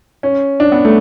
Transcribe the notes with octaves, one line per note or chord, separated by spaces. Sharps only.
C#4
D4
B3
A3